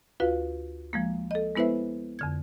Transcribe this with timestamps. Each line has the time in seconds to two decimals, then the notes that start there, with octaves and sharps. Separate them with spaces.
0.20 D2 F4 F#4 B4 F5
0.93 F3 G#3 A#3
1.31 A4 D#5
1.56 G#3 B3 E4 B4 C5 E5
2.19 F2 D3 G#6